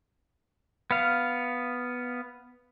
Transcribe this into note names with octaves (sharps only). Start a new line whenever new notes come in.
B3 F5